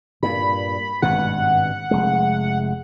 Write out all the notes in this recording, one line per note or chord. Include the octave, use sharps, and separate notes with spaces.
G2 A#2 B5
G#1 G2 B2 F#5
F1 G#3